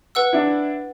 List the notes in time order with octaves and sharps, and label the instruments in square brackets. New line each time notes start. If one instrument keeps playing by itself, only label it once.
[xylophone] B4 F#5 E6
[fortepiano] D4 E4